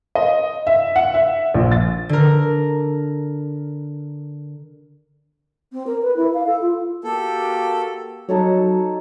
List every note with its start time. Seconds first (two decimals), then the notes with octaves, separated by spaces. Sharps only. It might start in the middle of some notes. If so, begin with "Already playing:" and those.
0.15 D#5
0.67 E5
0.96 F#5
1.14 E5
1.54 A#1
1.71 A6
2.09 D3 A#4
5.73 C4
5.87 A#4
6.02 B4
6.16 E4
6.34 F5
6.46 A4
6.62 F4
7.04 A#3 F#4 G4 A4
8.29 F#3 D#4 A4 C#5